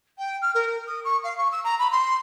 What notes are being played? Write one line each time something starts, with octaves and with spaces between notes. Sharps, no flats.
G5
F6
A#4
D#6
C#6
F5
C#6
E6
A#5
B5
C6